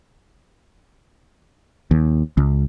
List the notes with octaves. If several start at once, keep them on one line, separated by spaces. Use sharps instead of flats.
D#2
C#2